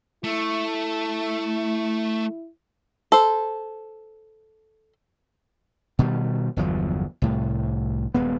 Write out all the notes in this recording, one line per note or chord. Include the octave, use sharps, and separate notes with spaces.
A3 E4
A4 C5
B2 D#3 G3
G1 E2 F3 F#3
C2 A2
D#1 G2 G#3 B3